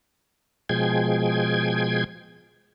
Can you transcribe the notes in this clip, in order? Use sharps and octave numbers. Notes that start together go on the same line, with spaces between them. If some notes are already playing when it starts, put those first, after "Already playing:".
B2 F3 G#3 G#4 G5 G#6